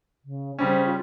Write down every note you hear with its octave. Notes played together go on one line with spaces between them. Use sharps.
C#3
C#3 G3 C#4 C5
F4